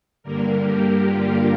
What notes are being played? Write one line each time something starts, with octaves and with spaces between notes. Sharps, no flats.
G2 D3 G3 A#3 A#4
G4
F4